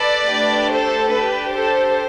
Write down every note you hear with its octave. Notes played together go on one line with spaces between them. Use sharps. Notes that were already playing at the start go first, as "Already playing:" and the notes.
Already playing: A4 B4 D5
A3 D4 G4
A4 C5
D4 G4 B4
A4 C5